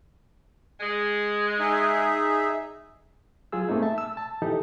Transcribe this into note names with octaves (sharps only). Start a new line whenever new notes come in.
G#3
D#4 G#4 E5
F#3 F4 G#4 E6
A3 A#3 C4 D#4 G#4
E5 A5
E6
A5
E3 D#4 G4 A4